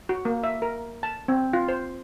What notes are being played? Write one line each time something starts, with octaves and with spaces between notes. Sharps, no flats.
F#4
A#3
E5
A#4
A5
C4
F4
C5